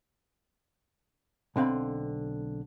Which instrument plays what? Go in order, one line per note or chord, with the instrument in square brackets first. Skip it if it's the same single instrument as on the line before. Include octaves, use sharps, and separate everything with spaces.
[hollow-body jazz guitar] B1 D3 C4 F5 B5